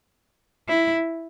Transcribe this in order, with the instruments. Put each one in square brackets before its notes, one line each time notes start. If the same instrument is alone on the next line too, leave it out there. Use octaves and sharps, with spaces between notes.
[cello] E4